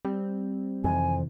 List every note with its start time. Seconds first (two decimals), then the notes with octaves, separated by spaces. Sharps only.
0.05 G3 C4
0.84 F2 C3 D#3 E3 G#5